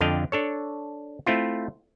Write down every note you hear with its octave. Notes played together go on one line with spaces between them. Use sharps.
F2 D3 D4 D#5 F5 G5
D4 A4 C#5
A3 C4 E4 F4